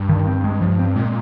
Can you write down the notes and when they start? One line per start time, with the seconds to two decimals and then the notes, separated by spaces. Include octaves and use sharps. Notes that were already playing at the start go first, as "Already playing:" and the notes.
Already playing: G2
0.09 D#3
0.27 C4
0.44 G#3
0.61 F3
0.79 C4
0.96 A#2 G#3